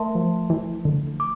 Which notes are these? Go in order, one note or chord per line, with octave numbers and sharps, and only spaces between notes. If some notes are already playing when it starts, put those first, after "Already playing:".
Already playing: A3 A#4 E5 A5 C6
F3
E3
D3
D6